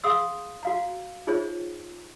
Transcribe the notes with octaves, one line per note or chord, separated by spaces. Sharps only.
G#4 F5 F#5 C6 D#6 E6
F#4 F5 A#5
D#4 F4 G#4 C5 C#5